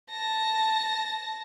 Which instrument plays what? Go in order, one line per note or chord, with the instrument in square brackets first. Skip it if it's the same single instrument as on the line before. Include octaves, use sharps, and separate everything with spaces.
[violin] A5 A#6